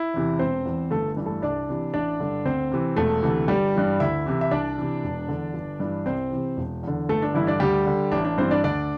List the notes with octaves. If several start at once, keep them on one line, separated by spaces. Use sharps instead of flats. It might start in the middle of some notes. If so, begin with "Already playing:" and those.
Already playing: E4
E2 C3 E3
E1 C4 C5
E2 E3
G1 A3 A4
G2 E3
A3 A4
C2 D4 D5
C3 E3
A1 D4 D5
G2 D3
D2 C4 C5
C3 E3
E1 A3 A4
D2 C3 E3
G1 G3 G4
G2 E3
D2 E4 E5
C3 E3
E5
C2 D4 D5
C3 E3
E1
E2 D3
G1
G2 E3
C2 C4 C5
C3 E3
E1
E2 D3
G1 A3 A4
D4
G2 D3 E3 E4
D4 D5
D2 G3 G4
D3
A1 D4
D4
G2 E3 C4 C5
D4 D5
D2 D4 D5